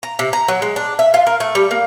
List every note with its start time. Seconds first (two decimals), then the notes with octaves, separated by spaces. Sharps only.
0.03 A#5
0.19 C3
0.33 A#5
0.48 F#3
0.62 G#3
0.76 D4
0.99 E5
1.14 F4
1.27 A#4
1.40 A3
1.55 G3
1.71 A#3